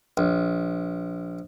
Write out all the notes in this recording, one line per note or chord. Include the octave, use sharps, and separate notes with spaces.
A#1